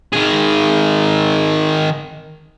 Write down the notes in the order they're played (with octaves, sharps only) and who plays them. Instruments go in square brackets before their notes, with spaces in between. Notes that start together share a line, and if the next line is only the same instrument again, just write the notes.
[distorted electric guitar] D#3 G#4